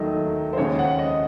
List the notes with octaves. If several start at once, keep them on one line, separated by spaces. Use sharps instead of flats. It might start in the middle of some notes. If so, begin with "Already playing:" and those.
Already playing: D#2 D#3 F#3 A3 D#5
C5
D#2 C#3 G#3 C#5
F#5
D#5